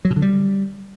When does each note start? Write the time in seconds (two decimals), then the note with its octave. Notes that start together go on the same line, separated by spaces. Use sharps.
0.05 F#3
0.10 B2
0.16 D3
0.22 G3